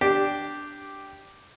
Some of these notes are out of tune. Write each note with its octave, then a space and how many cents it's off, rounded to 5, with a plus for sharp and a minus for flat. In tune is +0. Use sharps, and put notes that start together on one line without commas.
D4 +0 G4 -5